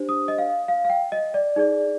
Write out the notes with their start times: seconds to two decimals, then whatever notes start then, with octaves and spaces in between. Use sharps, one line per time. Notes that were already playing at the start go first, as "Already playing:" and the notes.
Already playing: D4 G4 C5
0.09 D#6
0.28 D#5
0.38 F5
0.68 F5
0.84 F5
0.90 G5
1.12 D#5
1.34 D5
1.56 D#4 G#4 D5